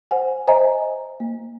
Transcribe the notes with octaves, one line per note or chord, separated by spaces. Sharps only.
C5 F#5 G#5
C5 D#5 E5 G#5 A#5
A#3